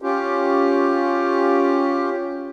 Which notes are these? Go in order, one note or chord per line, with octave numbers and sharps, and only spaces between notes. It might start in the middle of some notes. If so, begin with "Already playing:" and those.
C#4 F4 G4